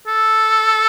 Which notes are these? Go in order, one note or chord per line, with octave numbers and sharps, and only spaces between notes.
A4